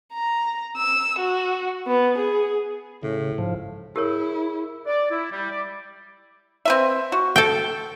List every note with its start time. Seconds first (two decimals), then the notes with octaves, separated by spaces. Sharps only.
0.13 A#5
0.77 E6
1.19 F#4
1.87 B3
2.18 G#4
3.03 A2 C#3
3.38 G#2 F3
3.96 E4 G4 G#4 A#4 C#5 E6
4.87 D5
5.10 E4
5.31 G3
5.51 D5
6.65 C4 B4 E5
7.12 F#4
7.36 A4 G5